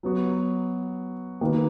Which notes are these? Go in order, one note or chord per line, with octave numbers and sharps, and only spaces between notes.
F#3 B3 F#4
D#3 A#3 D#4 F#4 B4